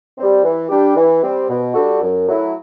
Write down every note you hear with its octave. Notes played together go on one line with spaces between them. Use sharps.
G3 C4
E3
G3 D4 G4
E3
G3 C4
B2
G3 D4 F#4 A4
F#2
F#3 A3 E4